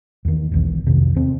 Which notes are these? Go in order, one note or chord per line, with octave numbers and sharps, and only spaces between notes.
E2 D#3
E1 B1 E2
F2 C3 D#3
E2 C4